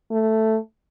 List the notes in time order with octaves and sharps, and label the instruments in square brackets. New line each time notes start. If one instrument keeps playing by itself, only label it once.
[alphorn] A3